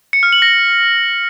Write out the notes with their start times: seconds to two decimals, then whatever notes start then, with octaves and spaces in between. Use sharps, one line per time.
0.13 C#7
0.23 F6
0.33 F#7
0.42 A#6